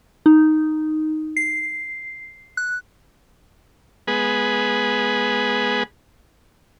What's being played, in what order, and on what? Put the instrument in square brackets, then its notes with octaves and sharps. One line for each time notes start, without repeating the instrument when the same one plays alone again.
[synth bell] D#4
C7
F#6
[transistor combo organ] G#3 B3 G#4 B4